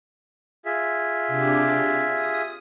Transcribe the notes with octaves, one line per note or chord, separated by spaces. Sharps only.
F4 G#4 E5
C3 D4 G4
D#6